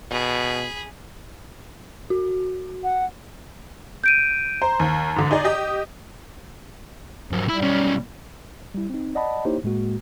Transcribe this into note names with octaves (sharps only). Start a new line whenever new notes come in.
B2 G#4 B5
F#4
F#5
G6 D7 D#7
C5 A#5
D#2
G#2 D3
D#4 G#4 D5
G4 D#5
G#2 F3 F#3
G3 E4
B1 C#4
G3 E4
C4 D#4
D5 D#5 F#5 A5 B5
A#3 D#4 E4 G4 C5 C#5
A2 G#3 A#3 F#4